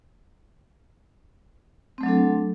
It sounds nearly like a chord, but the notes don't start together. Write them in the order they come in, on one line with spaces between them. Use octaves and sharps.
C4 A3 F#3 D4 A4